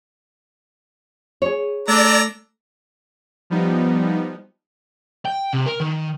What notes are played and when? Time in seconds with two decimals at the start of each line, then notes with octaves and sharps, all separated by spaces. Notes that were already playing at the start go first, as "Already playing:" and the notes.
1.42 G#4 C#5
1.88 A3 D4 D5 A#5 E6
3.50 F3 G3 B3 D#4
5.25 G5
5.53 C3
5.66 A#4
5.80 D#3